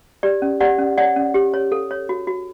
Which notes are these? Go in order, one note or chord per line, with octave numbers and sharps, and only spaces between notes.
G4 D5
C#4
G4 D5 F#5
C#4
C#5 D5 F#5
C#4
G4
C#5
A4
C#5
F#4
F#4